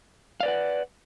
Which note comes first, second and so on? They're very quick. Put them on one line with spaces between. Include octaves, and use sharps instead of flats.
F5 D5 B4 F#5